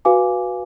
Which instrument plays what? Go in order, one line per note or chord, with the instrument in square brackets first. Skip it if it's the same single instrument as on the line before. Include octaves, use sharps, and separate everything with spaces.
[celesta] F#4 B4 F5 G#5 D6